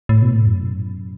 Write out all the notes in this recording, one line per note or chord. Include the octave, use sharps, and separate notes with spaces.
A2
B2
A2
F#2